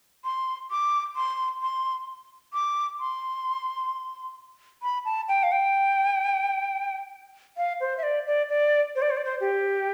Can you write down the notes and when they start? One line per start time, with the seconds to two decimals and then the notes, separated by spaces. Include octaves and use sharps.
0.24 C6
0.71 D6
1.16 C6
1.62 C6
2.53 D6
3.00 C6
4.83 B5
5.05 A5
5.28 G5
5.43 F5
5.52 G5
7.57 F5
7.81 C5
7.98 E5
8.03 D5
8.27 D5
8.49 D5
8.96 C5
9.02 D5
9.11 C5
9.17 D5
9.25 C5
9.40 G4